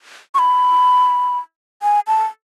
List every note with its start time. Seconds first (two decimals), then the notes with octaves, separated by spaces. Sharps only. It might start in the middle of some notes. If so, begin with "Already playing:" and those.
0.35 C#6
0.39 B5
1.83 G#5
2.07 A5